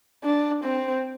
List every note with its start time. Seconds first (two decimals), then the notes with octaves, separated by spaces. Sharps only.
0.23 D4
0.64 C4